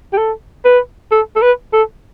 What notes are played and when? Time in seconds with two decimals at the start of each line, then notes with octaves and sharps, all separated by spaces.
0.13 G4
0.18 A4
0.65 B4
1.12 A4
1.36 A4
1.42 B4
1.73 A4